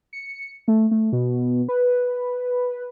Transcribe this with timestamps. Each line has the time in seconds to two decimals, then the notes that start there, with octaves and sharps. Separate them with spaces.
0.13 C#7
0.68 A3
0.91 A3
1.12 B2
1.69 B4